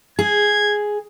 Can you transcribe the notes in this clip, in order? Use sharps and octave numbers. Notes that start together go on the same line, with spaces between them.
G#4 G#6